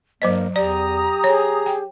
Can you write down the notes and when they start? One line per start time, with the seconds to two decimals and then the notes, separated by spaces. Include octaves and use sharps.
0.22 G2 F#3 A#3 C5 D#5
0.56 E2 G4 D5 A#5 D#6
1.24 G#4 C#5
1.66 G5